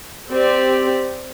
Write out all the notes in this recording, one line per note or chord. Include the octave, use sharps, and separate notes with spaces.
C4 G4 D5